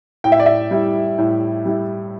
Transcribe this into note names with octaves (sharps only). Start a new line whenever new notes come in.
A2 G5
E5
D5
E5
G3 E4
A2
G3 E4